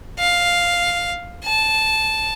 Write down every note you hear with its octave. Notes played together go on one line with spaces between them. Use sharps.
F5
A5